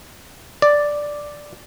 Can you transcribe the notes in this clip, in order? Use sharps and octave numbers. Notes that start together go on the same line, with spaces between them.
D5